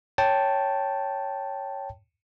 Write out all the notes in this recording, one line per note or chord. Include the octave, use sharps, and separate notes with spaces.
C#5 G5 A5